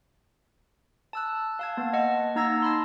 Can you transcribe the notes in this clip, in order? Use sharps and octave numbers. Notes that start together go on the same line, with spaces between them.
A5 E6 F#6
F5 A5 G#6
A#3 B3
D#5 F#5 A5
A#3 D#4 A#5 E6 G#6 A#6
A5 B5 C6